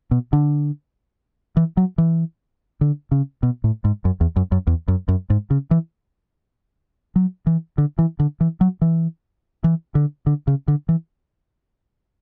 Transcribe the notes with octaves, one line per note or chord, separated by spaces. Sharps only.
B2
D3
E3
F#3
E3
D3
C#3
B2
A2
G#2
F#2
E2
F#2
F#2
E2
F#2
F#2
G#2
C#3
E3
F#3
E3
D3
E3
D3
E3
F#3
E3
E3
D3
D3
C#3
D3
E3